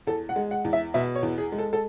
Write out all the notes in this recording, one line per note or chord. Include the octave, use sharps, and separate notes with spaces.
E2 A4
F#5
G#3
F#5
E2
E5
B2 E5
C#5
E2
G#4
G#3
A4
A4